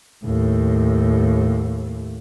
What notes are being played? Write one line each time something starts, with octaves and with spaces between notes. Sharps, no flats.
D#2 A2